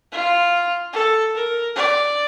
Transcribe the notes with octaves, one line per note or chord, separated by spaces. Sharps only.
F4
A4
A#4
D5